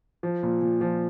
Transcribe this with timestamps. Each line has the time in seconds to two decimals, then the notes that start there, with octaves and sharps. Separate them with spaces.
0.23 F3
0.43 A#2
0.61 A#2
0.81 F3